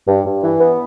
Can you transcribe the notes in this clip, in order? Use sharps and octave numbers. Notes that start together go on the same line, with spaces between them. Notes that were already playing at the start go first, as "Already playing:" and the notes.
G2
G2
E3
B3